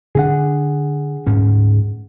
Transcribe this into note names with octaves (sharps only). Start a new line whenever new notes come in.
D3 C4 D4 G#4 F#5
D2 G#2 C#4